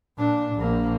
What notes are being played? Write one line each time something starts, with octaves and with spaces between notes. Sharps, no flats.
A#2 D4
A#1 A#3